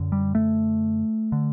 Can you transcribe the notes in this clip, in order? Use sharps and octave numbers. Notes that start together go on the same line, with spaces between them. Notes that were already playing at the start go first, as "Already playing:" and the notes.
Already playing: F#2 D3
G3
A3
D3